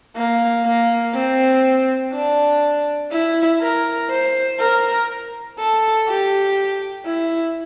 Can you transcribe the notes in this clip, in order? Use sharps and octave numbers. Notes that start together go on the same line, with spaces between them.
A#3
A#3
C4
D4
E4
A#4
C5
A#4
A4
G4
E4